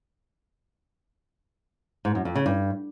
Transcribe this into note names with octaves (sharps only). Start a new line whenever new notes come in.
G#2
F#2
F2
C#3
G2